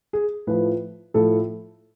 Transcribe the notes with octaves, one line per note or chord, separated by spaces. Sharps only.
G#4
A2 F3 B4
A2 F3 A4